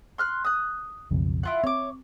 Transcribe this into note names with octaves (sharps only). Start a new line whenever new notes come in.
C6 F6 F#6
D#6 F#6
B1 F2 C#3
E4 F4 F#5
C4 C#5 D6